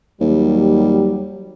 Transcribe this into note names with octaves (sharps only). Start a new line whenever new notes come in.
D#2 F#3 G3